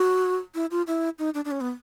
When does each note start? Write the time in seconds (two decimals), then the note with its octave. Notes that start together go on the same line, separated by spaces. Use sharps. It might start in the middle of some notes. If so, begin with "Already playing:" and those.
Already playing: F#4
0.55 E4
0.71 F4
0.87 E4
1.19 D#4
1.34 D4
1.45 D4
1.51 C#4
1.61 B3